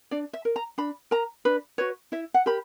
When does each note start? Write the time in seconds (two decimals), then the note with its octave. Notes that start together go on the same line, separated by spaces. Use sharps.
0.11 D4 D5
0.33 E5
0.45 A#4
0.56 A#5
0.78 D4 B5
1.11 A#4 A#5
1.45 D4 B4
1.78 F#4 B4 C#5
2.12 E4 E5
2.34 F#5
2.46 G4 A#4 B5